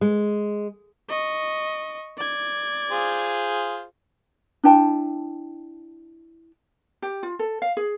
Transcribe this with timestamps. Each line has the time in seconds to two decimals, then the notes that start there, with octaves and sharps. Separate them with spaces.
0.01 G#3
1.09 D#5 C#6
2.17 D5 G#6
2.91 F4 G#4 C5
4.64 D4 E4 G5 A5
7.02 G4
7.23 F4
7.39 A4
7.62 F5
7.77 G#4